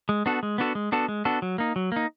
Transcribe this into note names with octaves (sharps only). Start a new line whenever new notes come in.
G#3
B3 D4 F#4 A4
G#3
B3 D4 F#4 A4
G#3
B3 D4 F#4 A4
G#3
B3 D4 F#4 A4
F#3
A#3 D#4
F#3
A#3 D#4